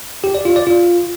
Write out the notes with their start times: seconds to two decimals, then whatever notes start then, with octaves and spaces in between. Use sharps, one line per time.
0.24 G4
0.34 D5
0.45 F4
0.56 D5
0.67 F4